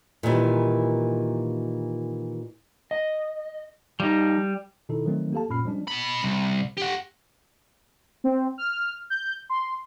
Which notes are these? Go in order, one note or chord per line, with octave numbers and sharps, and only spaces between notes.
A#2 D#3 E3 G3
D#5
F3 G3 D#4
B2 D#3 D#4 E4 A4
D#3 F3 F#3 A3 C4 D#4
A#3 G4 A4 F5 A5
F#2 A#2 C#4 B5 F6 C7
F3 G3 G#3 C#4 D4
B2 B5
C2
G4 F#5
C4
F6
G6
C6